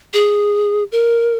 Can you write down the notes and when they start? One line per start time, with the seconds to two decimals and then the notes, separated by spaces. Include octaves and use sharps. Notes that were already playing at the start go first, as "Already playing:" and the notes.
0.13 G#4
0.92 A#4